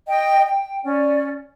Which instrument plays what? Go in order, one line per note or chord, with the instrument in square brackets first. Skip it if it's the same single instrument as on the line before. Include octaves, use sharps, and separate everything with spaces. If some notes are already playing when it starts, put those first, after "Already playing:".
[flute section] D#5 G5
G5
C#4 D5